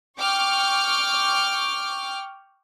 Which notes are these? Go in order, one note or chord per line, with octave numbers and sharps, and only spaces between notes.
G5 C#6 D6 F6